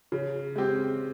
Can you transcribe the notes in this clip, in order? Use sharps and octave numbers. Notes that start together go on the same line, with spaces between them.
C#3
G#3 C4 G4